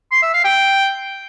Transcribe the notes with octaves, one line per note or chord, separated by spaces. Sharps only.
C6
E5
F5
G5